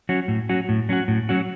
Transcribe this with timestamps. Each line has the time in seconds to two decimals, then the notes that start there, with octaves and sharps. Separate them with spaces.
0.09 F#3 C#4 F#4
0.28 A2
0.49 F#3 C#4 F#4
0.69 A2
0.89 F#3 C#4 F#4
1.08 A2
1.29 F#3 C#4 F#4